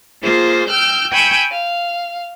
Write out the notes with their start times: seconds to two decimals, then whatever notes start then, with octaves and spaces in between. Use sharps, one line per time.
0.23 A#3 F4 G#4 C5
0.69 G5 E6 F6 G6
1.11 G5 G#5 B5 C#6 E6 G6
1.49 F5